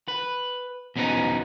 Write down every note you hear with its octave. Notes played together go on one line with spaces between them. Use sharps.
B4
E2 B2 C#4 D#4 B4 A#5